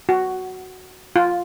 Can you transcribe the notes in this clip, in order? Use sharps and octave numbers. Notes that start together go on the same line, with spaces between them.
F#4
F4